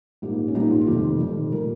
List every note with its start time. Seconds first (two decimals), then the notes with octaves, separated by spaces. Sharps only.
0.22 A#1 G#2 G3 A#3 G4
0.48 C#4
0.55 A#1 G#2 G3 A#3 D#4
0.71 F4
0.81 F4
0.86 F1 F2 D#3 G4
1.19 F1 F2 D#3
1.52 A#2 G3 A#4